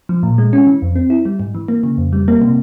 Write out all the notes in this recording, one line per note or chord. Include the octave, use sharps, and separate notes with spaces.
F3
A#2
G#3
C#4
E3
F2
C4
E4
G3
G#2
E3
A#3
C#3
F2
G3
A#3
C3